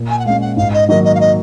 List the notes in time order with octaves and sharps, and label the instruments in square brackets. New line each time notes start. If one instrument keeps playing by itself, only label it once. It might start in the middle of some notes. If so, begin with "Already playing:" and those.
Already playing: [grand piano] A#2
[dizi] G#5
F#5
[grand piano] G#3 C#4 [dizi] F5
[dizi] F#5
[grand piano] G#2 [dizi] F5
[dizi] D#5
[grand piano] D#3 F#3 A#3 [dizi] D#5
[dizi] D#5
F5
D#5